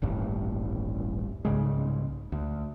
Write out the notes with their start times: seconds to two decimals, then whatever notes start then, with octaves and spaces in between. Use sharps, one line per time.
0.02 D#1 A1 G2
1.45 C2 G#2 C#3 G#3
2.32 D2